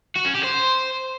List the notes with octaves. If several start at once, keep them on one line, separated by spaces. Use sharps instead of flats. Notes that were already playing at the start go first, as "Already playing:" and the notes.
F#4
C#4
G4
C5